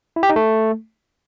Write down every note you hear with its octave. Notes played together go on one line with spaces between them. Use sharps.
E4
G4
D#4
A3